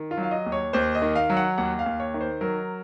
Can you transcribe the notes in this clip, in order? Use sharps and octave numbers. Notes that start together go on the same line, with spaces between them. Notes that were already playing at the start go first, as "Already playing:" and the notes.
Already playing: D#3
F4
F#3
F5
D#5
D#2
C#5
D#2 C5
D#5
D#3
F5
F#3
F#5
D#2 F#5
F5
D#2
C#5
D#3
C5
F#3 A#4